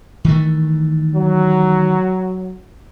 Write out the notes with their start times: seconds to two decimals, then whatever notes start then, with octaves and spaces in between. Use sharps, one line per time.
0.24 D#3 E3 A3
1.15 F#3